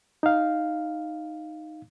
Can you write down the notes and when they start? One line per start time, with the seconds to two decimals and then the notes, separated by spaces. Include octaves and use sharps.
0.23 D#4 F5